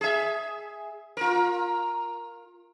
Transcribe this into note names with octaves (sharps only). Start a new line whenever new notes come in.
G#4 E5
F4 A#4